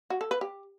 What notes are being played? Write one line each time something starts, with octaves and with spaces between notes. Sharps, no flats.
F#4
A4
B4
G4